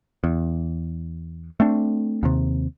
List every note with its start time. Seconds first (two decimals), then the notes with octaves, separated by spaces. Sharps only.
0.24 E2
1.60 A3 C4 D4
2.23 D#2 C3